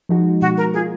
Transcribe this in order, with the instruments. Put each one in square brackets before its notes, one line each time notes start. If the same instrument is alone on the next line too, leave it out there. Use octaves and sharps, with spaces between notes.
[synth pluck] F3 G#3 D#4 F#4
[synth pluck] B2 [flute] F#4
[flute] A#4
[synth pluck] A#3 [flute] G#4
[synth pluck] F4